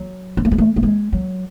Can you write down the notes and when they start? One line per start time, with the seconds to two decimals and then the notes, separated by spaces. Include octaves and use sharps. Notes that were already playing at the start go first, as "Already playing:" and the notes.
Already playing: F#3
0.37 C4
0.45 A3
0.51 G#3
0.58 A3
0.76 A3
0.83 G#3
1.13 F#3